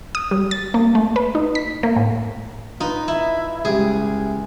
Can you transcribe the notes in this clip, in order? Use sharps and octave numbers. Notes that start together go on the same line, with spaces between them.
D#6
G3
A6
A#3
A3
B4
D#4
B6
A#3
A2
D#4 F4 B4
E4
C#2 G3 G#4